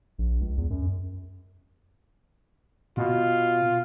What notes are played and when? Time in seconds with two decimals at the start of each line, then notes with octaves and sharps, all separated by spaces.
0.19 A#1
0.41 C#2
0.58 E2
0.70 F#2
2.97 B2 F4